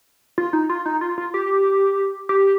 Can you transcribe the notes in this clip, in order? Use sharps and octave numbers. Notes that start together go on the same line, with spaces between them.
F4
D#4
F4
D#4
F4
F4
G4
G4